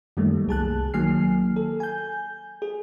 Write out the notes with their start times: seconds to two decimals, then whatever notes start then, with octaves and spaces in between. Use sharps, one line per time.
0.17 F#2 D#3 G3 A3 A#3
0.47 C2 G#4 A5 F#6
0.94 D#3 F#3 A#3 G#5 F6 C7
1.56 A4
1.80 G#5 G6
2.62 G#4